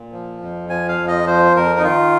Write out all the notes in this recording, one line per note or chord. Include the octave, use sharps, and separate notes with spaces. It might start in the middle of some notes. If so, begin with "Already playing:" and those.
Already playing: A#2
F3
F2
F3 G#5
F5
F2
D#5
F3 C5
F2 A#4
D#4
D#3 F4